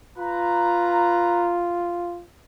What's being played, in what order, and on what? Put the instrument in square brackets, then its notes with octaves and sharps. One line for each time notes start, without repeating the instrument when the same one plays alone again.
[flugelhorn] F4 [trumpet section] B4 A#5